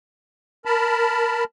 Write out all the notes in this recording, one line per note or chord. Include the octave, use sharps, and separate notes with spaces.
A#4 A5 B5